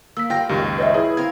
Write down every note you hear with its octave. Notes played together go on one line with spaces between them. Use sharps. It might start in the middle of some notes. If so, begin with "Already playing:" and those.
A#3 E6 B6
G3 A#3 F4 F5 G5 A#6
C#2 F#2 D#3 G4
B4 C#5 D#5 E5
E4 G#4 B4 C#5
C4 A#4 F5 G#6